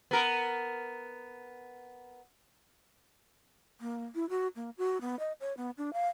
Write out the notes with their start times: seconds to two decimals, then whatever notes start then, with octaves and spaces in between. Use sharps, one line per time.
0.11 B3 A#4
3.81 A#3
4.15 E4
4.29 F#4
4.56 A#3
4.78 F#4
5.01 B3
5.19 D#5
5.40 C#5
5.57 B3
5.78 D4
5.93 F5